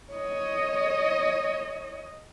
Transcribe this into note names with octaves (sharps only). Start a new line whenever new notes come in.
C#5 D#5